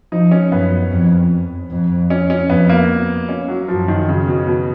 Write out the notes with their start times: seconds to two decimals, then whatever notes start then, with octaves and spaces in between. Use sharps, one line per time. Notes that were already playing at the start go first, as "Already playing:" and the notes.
0.12 F3 D#4
0.31 C#4
0.52 F#2 B3
0.91 F2
1.71 F2
2.10 C#4
2.30 C#4
2.49 F2 B3
2.69 A#3
3.29 C#4
3.48 F#3
3.68 F#2 F3
3.88 D#3
4.08 C#3
4.28 B2
4.47 B2